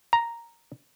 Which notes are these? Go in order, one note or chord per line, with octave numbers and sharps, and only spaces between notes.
A#5